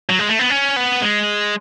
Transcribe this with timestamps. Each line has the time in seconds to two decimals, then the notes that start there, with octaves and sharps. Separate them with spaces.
0.09 F#3
0.19 G#3
0.29 A3
0.39 B3
0.50 C#4
0.76 B3
1.02 G#3